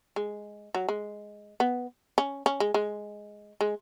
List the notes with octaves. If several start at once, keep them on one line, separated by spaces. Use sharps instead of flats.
G#3
F#3
G#3
B3
C#4
C#4
G#3
G#3
G#3